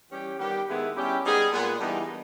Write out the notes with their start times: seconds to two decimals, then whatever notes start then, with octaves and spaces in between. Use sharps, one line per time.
0.11 E3 G3 C#4 G4
0.39 D#3 G3 B3 G4
0.67 G2 D#3 G#3 B3 E4
0.96 G3 C#4 E4 G4
1.23 G3 B3 D#4 G#4
1.52 A#2 G#3 B3
1.80 G2 E3 G3 B3 D#4